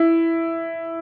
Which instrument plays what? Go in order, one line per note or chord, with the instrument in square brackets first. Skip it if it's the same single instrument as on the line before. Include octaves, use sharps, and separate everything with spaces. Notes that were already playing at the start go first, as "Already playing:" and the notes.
Already playing: [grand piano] E4